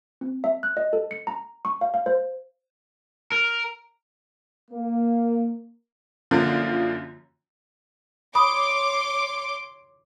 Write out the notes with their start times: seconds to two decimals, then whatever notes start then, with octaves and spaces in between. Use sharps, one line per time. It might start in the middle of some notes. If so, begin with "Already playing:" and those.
0.21 C4
0.44 E5
0.63 F#6
0.77 D#5
0.93 A4
1.11 C#7
1.27 A#5
1.65 C#6
1.81 F5
1.94 F5
2.06 C5
3.32 A#4
4.71 A#3
6.31 F#2 D3 F3 A#3 F4
8.35 C#5 B5 C6 D6 D#6